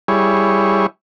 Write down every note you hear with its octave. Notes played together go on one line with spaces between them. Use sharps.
G3 E4 G#4 C#5